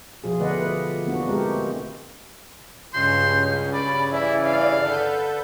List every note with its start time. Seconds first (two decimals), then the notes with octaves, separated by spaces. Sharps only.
0.24 B2 F3 F4 G#4
0.39 D3 A3 B4 D5 D#5 F#5
0.59 B4
1.06 E3 A#3 B3 D4 F#4
1.27 G#3 C4 G4 A#4
1.54 A3
2.94 C#2 G2 C#3 C#4 C6 G6
3.73 D5 B5
4.12 E3 E4 D5
4.45 F5
4.82 D3 A4 B4 G6